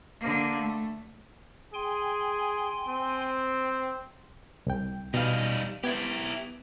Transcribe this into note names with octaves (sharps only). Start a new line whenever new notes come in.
D3 A#3
A3
G#4 G5 G#5 C6
C4
C2 G5
B2 G3 D#4 F5
B3 E4 G4 G#6